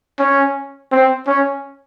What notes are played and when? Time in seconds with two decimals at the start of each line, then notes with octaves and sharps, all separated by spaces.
0.19 C#4
0.92 C4
1.27 C#4